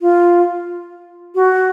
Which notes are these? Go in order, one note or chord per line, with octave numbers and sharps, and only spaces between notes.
F4
F#4